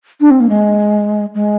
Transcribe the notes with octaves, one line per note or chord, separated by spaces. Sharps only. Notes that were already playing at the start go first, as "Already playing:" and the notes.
D4
C4
A#3
G#3
G#3